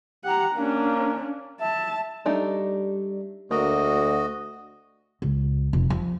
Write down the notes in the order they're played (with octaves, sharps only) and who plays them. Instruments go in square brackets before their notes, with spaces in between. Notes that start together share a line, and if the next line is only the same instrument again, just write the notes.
[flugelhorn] G4 [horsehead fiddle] F#5 A#5
[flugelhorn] A#3 [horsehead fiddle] C#4 D4
[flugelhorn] E5 [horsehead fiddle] A5
[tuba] G3 [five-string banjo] A3 D4 D#4
[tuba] D2 [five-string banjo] A#3 [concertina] F#4 D#5
[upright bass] C#2
F1
F3